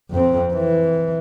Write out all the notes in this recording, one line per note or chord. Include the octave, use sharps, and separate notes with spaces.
F2 C4
E3